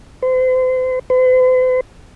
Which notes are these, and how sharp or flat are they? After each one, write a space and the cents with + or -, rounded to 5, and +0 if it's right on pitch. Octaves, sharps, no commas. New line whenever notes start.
C5 -35
C5 -45